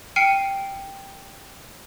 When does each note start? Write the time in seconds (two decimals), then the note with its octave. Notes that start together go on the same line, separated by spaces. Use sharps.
0.16 G5 F6 C7 C#7 D#7